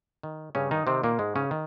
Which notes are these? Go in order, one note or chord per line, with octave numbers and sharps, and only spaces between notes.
D#3
G2 C#3 C#4
D#3 D#4
C3 D#3 C4
A#2 A#3
G#2 G#3
C#3 C#4
D#3